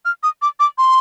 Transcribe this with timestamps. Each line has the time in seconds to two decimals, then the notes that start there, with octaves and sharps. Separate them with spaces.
0.05 F6
0.23 D#6
0.42 D6
0.60 D6
0.78 C6